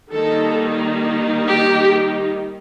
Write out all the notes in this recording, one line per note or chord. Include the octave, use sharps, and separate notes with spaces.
D#3 G3 A#3 D#4 A4
G4